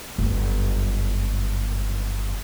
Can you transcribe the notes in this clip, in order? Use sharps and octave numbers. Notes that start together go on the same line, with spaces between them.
G1 F#2